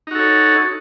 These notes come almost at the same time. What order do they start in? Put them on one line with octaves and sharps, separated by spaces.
D#4 F#4 A4 C#5